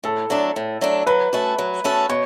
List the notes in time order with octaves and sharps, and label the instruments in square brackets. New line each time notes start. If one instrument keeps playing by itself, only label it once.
[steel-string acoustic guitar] A2 [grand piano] A4
[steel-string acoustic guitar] F#3 A3 D4
A2
F#3 A3 D4
[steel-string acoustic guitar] F#3 [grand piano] B4
[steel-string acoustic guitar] A3 C#4 F#4 A4
F#3
A3 C#4 F#4 A4
[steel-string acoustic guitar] B2 [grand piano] C#5